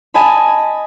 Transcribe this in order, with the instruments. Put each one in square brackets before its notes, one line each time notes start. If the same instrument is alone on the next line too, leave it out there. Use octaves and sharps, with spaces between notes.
[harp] D#5 G#5 A5 B5